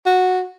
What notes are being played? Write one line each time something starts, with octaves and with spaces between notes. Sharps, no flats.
F#4